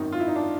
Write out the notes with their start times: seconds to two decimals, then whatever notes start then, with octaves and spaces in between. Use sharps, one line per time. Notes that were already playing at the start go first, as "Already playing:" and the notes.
Already playing: G#1 F#2 D#3 D#4
0.12 F4
0.20 E4
0.28 D#4
0.36 D4